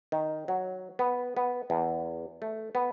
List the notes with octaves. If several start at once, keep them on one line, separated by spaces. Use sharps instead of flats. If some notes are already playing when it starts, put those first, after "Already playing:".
D#3
F#3
B3
B3
E2
A3
B3